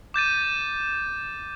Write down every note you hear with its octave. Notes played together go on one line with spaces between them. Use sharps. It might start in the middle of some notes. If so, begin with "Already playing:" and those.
D6 G6 A6 D#7